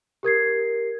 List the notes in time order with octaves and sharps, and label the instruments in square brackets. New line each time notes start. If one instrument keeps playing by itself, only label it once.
[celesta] G4 A#4 G#6 C7